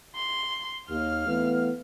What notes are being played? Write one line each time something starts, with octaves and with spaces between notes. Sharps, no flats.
C6
D#2 F5 F6
E3 A3 B3